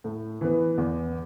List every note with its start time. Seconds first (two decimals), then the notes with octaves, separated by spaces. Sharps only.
0.04 A2
0.41 E3 B3
0.78 E2